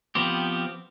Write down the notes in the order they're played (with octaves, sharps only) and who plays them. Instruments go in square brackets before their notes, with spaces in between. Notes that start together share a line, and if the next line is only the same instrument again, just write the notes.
[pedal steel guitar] F3 B3 C4 G4